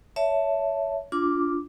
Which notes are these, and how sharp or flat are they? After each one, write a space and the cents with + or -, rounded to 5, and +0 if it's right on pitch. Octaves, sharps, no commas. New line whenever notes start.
C#5 +20 E5 +0 A5 +0
D4 -20 F4 +0 D6 +0